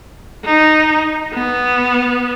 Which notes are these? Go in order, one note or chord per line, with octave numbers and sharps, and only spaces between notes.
D#4
B3